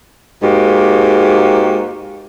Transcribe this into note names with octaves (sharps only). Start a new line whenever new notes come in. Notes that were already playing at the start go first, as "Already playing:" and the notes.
G#2 A#3 F#4 G4